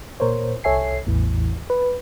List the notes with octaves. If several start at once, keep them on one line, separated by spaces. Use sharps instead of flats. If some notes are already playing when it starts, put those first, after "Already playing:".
A#2 A#4 C5 C#5
C2 A4 C#5 E5 G#5 C7
A1 E2 A2 E3
B4